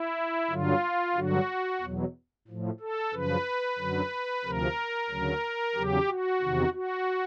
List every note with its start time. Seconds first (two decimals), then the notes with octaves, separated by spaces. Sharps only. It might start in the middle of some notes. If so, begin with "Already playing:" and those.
Already playing: E4
0.50 G2 D3 F#3 F4
1.15 G2 D3 F#3 F#4
1.81 E2 B2 F#3
2.48 A2 F3
2.80 A4
3.13 F#2 C#3 F3 B4
3.79 F#2 D3 F#3
4.44 D2 C3 F3 A#4
5.10 D2 C#3 F#3
5.75 E2 C#3 F#3 G4
6.08 F#4
6.42 E2 C3 D#3
6.73 F#4